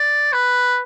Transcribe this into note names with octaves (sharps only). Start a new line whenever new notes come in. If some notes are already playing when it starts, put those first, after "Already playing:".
Already playing: D5
B4